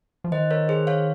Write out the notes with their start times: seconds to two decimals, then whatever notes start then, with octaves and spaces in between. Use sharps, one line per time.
0.24 F3
0.32 D#3 C5 D#5
0.51 A#4 C#5
0.69 G#4 C5
0.87 C#5 F5